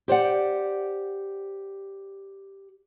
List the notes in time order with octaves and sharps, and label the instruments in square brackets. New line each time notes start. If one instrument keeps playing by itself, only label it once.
[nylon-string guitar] G4 C5 D5 F#5